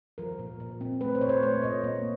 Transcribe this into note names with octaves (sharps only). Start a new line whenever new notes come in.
F3 A#4
A#2
A#2
C4
A3 B4
C5
A#2 C#5
C5
A3 C#5
A#2 D#5
A#3